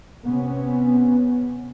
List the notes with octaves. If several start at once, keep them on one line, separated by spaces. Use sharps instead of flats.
C3 B3 C#4